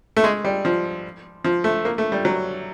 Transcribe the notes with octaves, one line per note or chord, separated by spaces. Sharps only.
A3
G#3
G3
F3
F3
A3
A#3
A3
G3
F#3